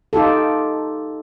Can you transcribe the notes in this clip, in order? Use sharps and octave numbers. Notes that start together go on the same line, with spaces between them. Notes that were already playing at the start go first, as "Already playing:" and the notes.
D#4 F4 G4 A4